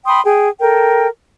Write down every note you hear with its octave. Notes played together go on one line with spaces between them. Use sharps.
G5 B5 C6 D#6
G#4 G5
A4 A#4 G5